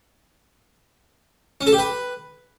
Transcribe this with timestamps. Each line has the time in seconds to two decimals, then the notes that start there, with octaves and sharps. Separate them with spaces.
1.61 C#4
1.67 A4
1.72 G4
1.78 B4